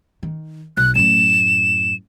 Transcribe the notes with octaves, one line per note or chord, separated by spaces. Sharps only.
D#3
B1 F#6
F#2 A2 E7